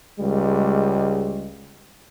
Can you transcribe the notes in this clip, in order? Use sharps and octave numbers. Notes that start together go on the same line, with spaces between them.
C#2 G3 G#3